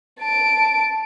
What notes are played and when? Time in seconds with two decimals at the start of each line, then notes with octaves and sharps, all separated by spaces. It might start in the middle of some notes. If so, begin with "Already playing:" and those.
0.20 A5 D7